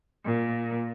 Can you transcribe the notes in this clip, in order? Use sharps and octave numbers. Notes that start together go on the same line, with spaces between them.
A#2